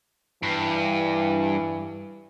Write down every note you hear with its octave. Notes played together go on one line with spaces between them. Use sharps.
G2 E3